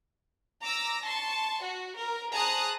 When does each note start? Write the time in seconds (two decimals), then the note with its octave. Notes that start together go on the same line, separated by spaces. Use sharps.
0.63 A#5 D6 E6 A#6
1.04 A5 C6 C#6
1.62 F#4
1.96 A#4
2.33 G#4 C5 A5 A#5 D#6 F#6